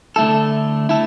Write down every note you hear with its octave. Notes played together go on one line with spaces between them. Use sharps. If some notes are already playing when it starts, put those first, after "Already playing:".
D2 D3 A3 E4 A4
D3 A3 E4 A4